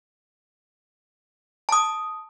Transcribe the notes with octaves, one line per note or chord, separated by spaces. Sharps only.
A5 D#6